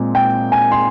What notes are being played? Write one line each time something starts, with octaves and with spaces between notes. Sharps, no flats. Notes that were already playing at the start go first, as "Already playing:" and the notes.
Already playing: A#2 G#3 C4
G5
G#5
C6